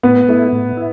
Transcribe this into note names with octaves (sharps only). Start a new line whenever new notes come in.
A2 B3
A3 E4
A2
E4